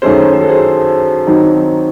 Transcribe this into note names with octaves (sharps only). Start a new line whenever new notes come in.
F#2 D#3 A3 C#4 G#4 C5
C5
A4
G#4 C5
D#3 F#3 C4 D#4